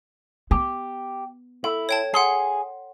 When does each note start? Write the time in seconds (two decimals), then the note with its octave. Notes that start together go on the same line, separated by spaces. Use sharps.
0.51 B3 G4
1.64 E4 A4
1.89 C#5 G5 A5
2.14 G#4 F#5 C6 C7